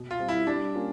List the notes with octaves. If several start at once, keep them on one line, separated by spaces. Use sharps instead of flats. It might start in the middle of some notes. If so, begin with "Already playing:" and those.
Already playing: B2
F4
G3 C4
E4
G3 D4
A#3 C#4 F4